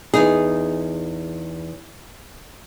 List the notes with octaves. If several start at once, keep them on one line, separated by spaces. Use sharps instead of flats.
E2 D#4 G#4